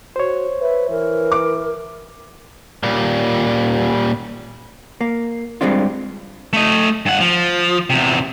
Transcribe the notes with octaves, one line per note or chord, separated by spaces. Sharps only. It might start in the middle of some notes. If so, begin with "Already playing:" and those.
F#4 C5 C#5
B4 E5
E3 A#4
D6
A#2 G3
A#3
G2 G3 G#3 C4 D4 F4
A3 D#5
G2 F#5
F3
E2 C3